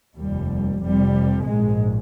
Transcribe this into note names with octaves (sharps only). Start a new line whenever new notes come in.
F1 D#2 G3
F1 F2 C3 G3
A#1 G#2 G#3